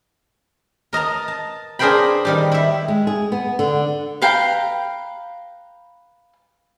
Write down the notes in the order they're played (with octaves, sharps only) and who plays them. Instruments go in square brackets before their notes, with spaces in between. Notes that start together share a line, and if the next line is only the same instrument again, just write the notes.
[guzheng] A#4 D#5 A5 A#5
A5
D4 G#4 A#4 C5 G5 B5
D#3 G3 G4
E4 E5
[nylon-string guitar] G#3
G#4
B3
D3
[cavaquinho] B4 F5 G5 A#5